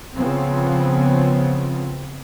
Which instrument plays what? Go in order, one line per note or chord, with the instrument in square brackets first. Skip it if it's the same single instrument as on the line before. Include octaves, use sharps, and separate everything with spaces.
[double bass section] C#3 F3 B3 C4